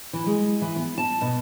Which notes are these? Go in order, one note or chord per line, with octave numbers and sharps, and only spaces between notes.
E3
G#3
E3
B3
A5
B2